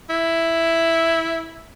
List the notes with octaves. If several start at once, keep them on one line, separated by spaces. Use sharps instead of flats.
E4